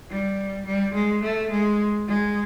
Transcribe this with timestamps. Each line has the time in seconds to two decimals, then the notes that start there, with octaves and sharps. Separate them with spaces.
0.10 G3
0.66 G3
0.94 G#3
1.23 A3
1.51 G#3
2.08 G#3